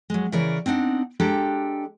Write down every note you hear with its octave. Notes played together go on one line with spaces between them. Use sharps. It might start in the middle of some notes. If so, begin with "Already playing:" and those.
F#3 G#3
C#3 E3 A#4 C#5 D5
C4 D4 D#4 F#5
G#3 D4 G4 A4 G5 A#5